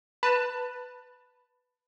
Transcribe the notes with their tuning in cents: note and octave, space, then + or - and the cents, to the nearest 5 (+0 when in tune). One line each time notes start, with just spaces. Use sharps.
B4 +0 A5 +20